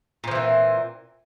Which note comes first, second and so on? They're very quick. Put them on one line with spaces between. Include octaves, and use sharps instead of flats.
A#2 F3 E3 C4